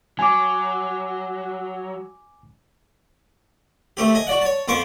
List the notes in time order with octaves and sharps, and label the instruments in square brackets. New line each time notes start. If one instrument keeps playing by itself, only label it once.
[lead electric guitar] F#3 [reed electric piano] G#5 D6
[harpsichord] A3 C4 G4
D#5 G#5
F#4 D5 F#5
C#5 A5
F2 B3 C5 C#6 D6